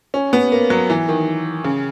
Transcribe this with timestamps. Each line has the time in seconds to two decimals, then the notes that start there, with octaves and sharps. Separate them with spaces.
0.14 C#4
0.33 B3
0.52 A#3
0.70 F#3
0.90 E3
1.09 D#3
1.64 C#3